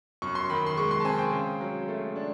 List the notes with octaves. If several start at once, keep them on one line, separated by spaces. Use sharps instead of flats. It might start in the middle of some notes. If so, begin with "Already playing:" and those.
F#2 C#6
C6
D#3 B5
C6
G#3 C#6
C6
A5
C4 G#5
G5
C#3
F#3
A3
D4